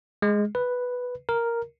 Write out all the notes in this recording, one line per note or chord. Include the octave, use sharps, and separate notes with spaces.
G#3
B4
A#4